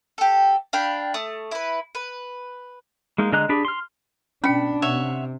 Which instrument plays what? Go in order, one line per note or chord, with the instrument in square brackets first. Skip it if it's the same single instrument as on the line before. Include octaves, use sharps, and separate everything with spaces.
[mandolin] G4 A4
D4 F5 G5 B5
A3 D#6
E4 B4
B4
[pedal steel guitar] G#3 A#3 D#4
D3 G#3 D#5 A#5 F#6
D4 G4 G#4 B5
C6 F6
[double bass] B2 D4 [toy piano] C#4 G5 [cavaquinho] B5
[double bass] C3 [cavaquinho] C#5 E5 F#5